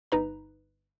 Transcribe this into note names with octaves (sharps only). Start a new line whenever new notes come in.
G1 D#4 B4 A#5